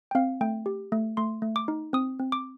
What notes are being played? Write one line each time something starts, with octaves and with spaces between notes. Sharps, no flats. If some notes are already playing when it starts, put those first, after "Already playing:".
G5
C4 F5
A3 G5
G4
A3
A3 C6
A3
D6
D#4
C4 D#6
C4
D6